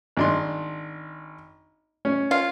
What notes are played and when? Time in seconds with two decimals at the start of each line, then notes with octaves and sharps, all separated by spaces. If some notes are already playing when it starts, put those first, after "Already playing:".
0.17 G#1 D4 C6
2.05 C#4
2.31 F4